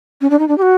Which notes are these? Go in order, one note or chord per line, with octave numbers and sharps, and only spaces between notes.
C#4
D4
D#4
D4
G4
F#4